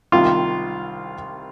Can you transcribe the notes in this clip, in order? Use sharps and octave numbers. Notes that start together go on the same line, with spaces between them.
C2 C3 D#3 F4